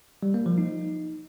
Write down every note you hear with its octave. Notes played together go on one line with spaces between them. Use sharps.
G3
A#3
F3
D#4